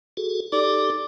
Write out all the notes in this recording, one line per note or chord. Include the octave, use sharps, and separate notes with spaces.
F#4 G#4 A4
D#4 G4 A4 D5